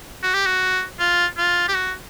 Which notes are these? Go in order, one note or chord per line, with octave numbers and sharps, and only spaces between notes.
F#4
G4
F#4
F4
F4
G4
F#4